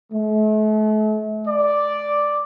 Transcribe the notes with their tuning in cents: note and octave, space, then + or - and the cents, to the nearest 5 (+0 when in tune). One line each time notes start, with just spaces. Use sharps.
A3 -40
D5 +0